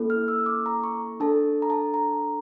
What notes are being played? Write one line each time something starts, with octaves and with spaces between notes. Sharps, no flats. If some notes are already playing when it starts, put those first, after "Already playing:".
Already playing: A#3 C#4 E4 A4
F6
E6
D6
A#5
C#6
D4 A4 A5
A#5
A5
A#5